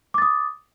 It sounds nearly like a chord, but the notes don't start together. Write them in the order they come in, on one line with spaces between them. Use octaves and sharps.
D6 A6 D#6